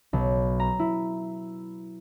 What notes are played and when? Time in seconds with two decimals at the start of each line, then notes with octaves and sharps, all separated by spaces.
0.13 B1
0.60 A#5
0.79 E4